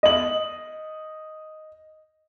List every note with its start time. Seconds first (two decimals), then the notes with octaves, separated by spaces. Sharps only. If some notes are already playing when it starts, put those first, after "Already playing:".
0.03 D#5 F#7